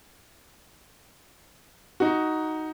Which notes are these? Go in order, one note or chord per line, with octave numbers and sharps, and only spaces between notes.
D#4 F#4